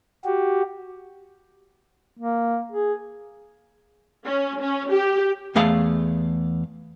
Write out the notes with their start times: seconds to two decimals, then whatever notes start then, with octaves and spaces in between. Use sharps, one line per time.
0.25 F#4 G4
2.19 A#3
2.72 G#4
4.26 C#4
4.61 C#4
4.91 G4
5.55 E2 A3 G#4 F5 A5